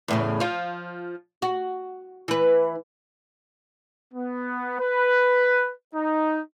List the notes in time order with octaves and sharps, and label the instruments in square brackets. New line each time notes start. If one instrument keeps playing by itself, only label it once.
[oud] E2 A2 C#3
F3 F4
F#4
E3 B4
[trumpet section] B3
B4
D#4